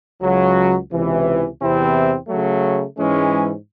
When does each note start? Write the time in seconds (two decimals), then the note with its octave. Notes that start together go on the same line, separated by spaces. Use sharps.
0.21 C#2 C#3 F#3
0.90 C#2 C3 E3
1.60 E2 C3 E3 C4 E4
2.28 C#3 F#3 A3
2.97 G#2 E3 G#3 C#4